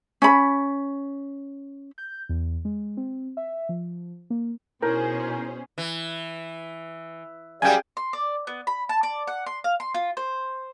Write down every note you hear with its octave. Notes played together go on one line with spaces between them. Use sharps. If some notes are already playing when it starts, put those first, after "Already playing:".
C#4 B5
G6
E2
G#3
C4
E5
F3
A#3
B2 C#4 D#4 E4 G#4 A#4 C5 G6
E3
F#2 G3 G#4 D5 F5 G5 G#5
C6
D5
B3
B5
A5
D5
F#5
C6
F5
C6
F4
C5